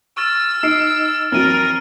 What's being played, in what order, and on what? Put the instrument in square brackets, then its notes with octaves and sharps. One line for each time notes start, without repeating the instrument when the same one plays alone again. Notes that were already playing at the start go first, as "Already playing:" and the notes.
[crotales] C#6 F6 A6 [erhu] E6
[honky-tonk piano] D#4 [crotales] F6 C7 D7
[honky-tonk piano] F2 E3 F#3 [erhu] A#4 [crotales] F6 A6 D#7